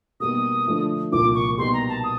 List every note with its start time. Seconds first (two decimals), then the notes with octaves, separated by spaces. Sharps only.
0.20 B2 G3 A#3 D#4 D#6
0.66 D3 F3 A3 D4
1.12 C2 A#2 F3 A#3 D6
1.35 C#6
1.58 B2 G3 A#3 D#4 C6
1.73 A#5
1.89 A5
2.04 D#6